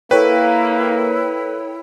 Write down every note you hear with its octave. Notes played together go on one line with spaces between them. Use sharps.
A#3 E4 A4 B4 C#5 G5